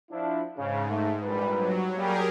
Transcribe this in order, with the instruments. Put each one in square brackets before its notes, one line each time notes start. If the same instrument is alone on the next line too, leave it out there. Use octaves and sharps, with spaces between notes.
[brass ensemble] F3 D4 E4
[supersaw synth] G#2 [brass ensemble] C#3
[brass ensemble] A3
[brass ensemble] A#1 B4 [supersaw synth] G3
[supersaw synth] F#3
[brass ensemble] G3 A#3 [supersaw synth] G4 G#4 A#4